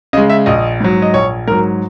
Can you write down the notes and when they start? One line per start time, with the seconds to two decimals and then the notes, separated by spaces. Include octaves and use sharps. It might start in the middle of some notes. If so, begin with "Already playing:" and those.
0.13 C#3 G#3 D#5
0.30 E5
0.46 A#1 D#5
0.80 G#2 F#3
1.02 D#5
1.14 A#1 C#5
1.47 G#2 F#3 A#4